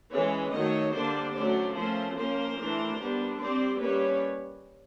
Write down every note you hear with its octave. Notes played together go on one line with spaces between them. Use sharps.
E3 G#3 C#4 B4 C#5
D#3 F#3 A3 C#5 D#5
D3 G3 A#3 D4 C5 D5
F#3 A3 C#4 C5 D5
F3 A3 C#4 A#4 C5
F3 A#3 C#4 A#4 C5
E3 A3 D4
G3 B3 D4
G3 C4 C5 D5
G3 A#3 C#4 B4 C#5